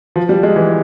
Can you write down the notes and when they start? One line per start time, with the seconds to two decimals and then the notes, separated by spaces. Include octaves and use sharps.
0.16 F3
0.29 G3
0.43 G#3
0.56 E3